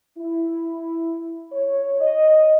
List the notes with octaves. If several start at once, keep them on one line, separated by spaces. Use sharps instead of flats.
E4
C#5
D#5